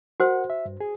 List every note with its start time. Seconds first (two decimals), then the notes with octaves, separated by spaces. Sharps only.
0.20 F#4 A#4 C5 F#5
0.50 E5
0.65 G2
0.80 G#4